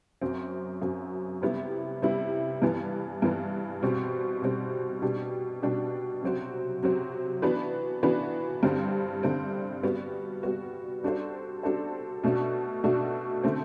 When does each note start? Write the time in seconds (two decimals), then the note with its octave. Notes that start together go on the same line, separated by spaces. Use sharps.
0.21 F#2 F#3 C4
0.82 F#2 F#3 C4
1.42 C3 G3 B3 E4
2.02 C3 G3 B3 E4
2.62 G2 E3 B3
3.22 G2 E3 B3
3.82 B2 G3 C4
4.42 B2 G3 C4
5.02 B2 G3 D4 G4
5.62 B2 G3 D4 G4
6.22 C3 F#3 C4 F#4
6.83 C3 F#3 C4 F#4
7.42 E3 B3 D4 F#4 B4
8.03 E3 B3 D4 F#4 B4
8.63 G2 D3 G3 C4
9.23 G2 D3 G3 C4
9.83 G3 B3 F#4
10.43 G3 B3 F#4
11.03 G3 D4 F#4 A4 C5
11.63 G3 D4 F#4 A4 C5
12.24 B2 A3 D4 F#4
12.84 B2 A3 D4 F#4
13.43 D3 A3 C4